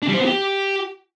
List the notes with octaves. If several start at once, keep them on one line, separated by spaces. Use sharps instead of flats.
D4
G3
C5
B3
G4